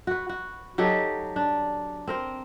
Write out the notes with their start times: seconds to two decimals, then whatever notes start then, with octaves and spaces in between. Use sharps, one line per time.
0.07 F#4 B4
0.29 F#4
0.78 F#3 D#4 G4 A4
1.36 D4
2.07 C4 A#4 C5